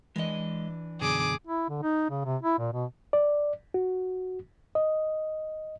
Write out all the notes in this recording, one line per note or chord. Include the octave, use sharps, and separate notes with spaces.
E3 G#3 D4 D#5
F#2 B2 D3 G#4 D6
E4
D3
D#4
C#3
C3
E4
A#2
B2
D5
F#4
D#5